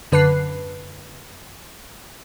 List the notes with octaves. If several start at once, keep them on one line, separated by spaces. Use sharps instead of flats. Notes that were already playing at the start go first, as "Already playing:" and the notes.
F#2 D3 B4 A5 F#6 C7